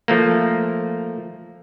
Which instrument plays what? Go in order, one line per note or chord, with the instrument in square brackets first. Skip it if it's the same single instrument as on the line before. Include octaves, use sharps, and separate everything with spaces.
[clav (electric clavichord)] F3 A3 A#3